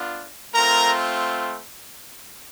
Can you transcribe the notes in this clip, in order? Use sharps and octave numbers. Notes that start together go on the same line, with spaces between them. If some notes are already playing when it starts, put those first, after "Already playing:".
Already playing: B3 D4 F4
A3 C4 F4 A#4 A#5